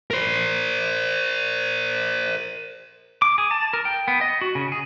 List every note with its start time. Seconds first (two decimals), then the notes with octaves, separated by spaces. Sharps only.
0.11 A#4 C5
3.22 D6
3.38 G#4
3.51 A5
3.73 A#4
3.85 G5
4.08 B3
4.21 D#5
4.41 F#4
4.55 C#3
4.72 G#4